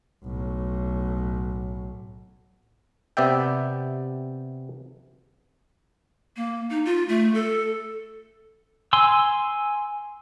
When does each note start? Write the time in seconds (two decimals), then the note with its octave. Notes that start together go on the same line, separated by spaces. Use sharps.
0.24 B1 A2
3.17 C3 B3 D5 E5 G5
6.36 A#3
6.70 D#4
6.85 F4
7.09 A3
7.34 A4
8.93 G#5 C6 E6